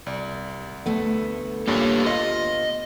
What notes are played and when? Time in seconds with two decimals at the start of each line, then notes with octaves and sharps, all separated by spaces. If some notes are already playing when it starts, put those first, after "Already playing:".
0.06 C2 D5
0.86 D2 A3 B3
1.67 A#1 G2 A#2 A#3 G4 C#5
2.06 F4 D#5